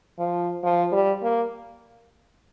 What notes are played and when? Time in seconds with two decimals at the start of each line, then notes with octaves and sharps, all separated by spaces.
0.19 F3
0.63 F3
0.92 G3
1.23 A#3